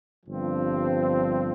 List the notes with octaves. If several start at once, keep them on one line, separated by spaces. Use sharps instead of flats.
G1 G2 F3 C4